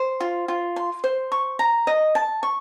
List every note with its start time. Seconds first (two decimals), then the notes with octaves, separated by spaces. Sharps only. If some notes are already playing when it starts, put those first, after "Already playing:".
Already playing: C5
0.20 F4
0.48 F4
0.76 C6
1.04 C5
1.32 C#6
1.59 A#5
1.87 D#5
2.15 A5
2.43 C#6